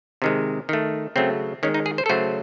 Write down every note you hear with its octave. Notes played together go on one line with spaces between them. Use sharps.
C3 D#3 G#3
D#3 A3
C#3 F#3 A3 C4
D#3 G#3 C#4
D#4
G#4
C5
A4
C#3 F#3 A3 C5